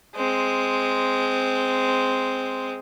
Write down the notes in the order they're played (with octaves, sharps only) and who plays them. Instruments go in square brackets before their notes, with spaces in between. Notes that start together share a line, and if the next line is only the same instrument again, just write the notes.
[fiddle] G#3 C4